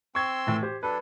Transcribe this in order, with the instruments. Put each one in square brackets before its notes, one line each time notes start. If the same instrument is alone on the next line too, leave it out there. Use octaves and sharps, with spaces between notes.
[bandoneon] C4 C6 E6 [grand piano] C#6 G#6
[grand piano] A2 E3
G4 C5
[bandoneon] F#3 D4 A4 [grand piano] B4